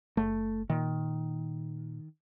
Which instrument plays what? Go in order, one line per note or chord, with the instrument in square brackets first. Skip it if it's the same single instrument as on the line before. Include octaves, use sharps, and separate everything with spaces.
[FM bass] F#1 [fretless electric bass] A3
[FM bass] A#2 [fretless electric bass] D#3